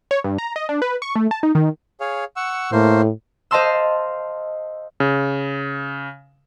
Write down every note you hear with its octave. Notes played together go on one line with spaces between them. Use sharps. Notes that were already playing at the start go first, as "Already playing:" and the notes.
C#5
G2
A#5
D#5
D4
B4
C#6
A3
A5
D#4
D#3
G#4 C#5 F5
F#5 C#6 E6
A2 A3 A#3 C5
C5 D#5 F5 A5 C6 E6
C#3